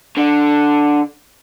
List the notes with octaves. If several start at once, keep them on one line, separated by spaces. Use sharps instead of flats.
D3